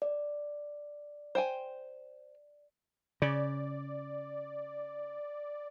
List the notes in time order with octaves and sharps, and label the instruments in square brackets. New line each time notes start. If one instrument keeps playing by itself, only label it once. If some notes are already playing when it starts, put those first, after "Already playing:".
[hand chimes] D5
[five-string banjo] C5 G5 G#5
[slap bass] C#3 [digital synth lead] D5